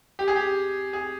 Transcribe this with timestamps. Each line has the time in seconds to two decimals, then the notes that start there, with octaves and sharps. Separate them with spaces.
0.19 G4
0.28 G#4
0.36 G4
0.93 G#4